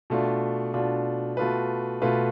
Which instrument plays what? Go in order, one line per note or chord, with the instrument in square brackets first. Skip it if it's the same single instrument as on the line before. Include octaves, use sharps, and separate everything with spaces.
[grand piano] B2 A3 D4 F4
B2 A3 D4 F4
B2 A3 F4 B4
B2 A3 F4 B4